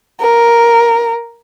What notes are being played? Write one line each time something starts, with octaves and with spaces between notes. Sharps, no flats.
A#4